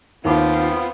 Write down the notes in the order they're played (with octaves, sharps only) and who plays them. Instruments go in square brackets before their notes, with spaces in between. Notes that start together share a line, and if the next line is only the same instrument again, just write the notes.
[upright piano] D#2 D6 [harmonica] B3 C4 [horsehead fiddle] F4